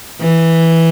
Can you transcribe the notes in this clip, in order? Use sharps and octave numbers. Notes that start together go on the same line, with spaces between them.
E3